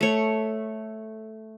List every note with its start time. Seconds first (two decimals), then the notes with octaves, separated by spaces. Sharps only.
0.01 A3 C#5